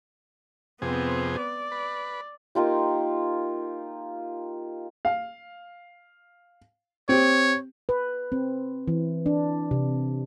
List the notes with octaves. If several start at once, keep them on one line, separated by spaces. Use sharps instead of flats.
F2 C3 B3 C4 G#4
D5
B4
A#3 D#4 F4 G4
F5
C4 G4 C#5
B4
C4
E3
D4
C3